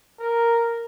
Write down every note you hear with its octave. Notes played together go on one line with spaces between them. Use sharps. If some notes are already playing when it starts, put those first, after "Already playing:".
A#4